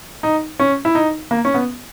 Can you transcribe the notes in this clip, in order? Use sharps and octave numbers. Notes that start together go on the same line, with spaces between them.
D#4
C#4
E4
D#4
A#3
C#4
B3